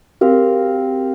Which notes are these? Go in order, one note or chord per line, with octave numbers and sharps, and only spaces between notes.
C4 G4 A#4 F5